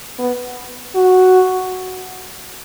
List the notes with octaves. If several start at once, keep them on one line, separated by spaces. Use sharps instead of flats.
B3
F#4